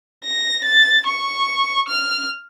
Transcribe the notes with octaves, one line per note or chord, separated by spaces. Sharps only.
A#6
A6
C#6
F6